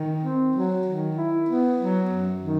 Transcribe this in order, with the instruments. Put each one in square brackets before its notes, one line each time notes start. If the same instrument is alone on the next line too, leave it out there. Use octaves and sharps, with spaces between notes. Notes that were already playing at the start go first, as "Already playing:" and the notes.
Already playing: [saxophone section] D#3
C4
F#3
D#3
E4
B3
F#3
F#2
D#3